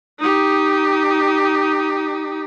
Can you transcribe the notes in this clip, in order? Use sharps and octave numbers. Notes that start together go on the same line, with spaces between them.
D#4 G4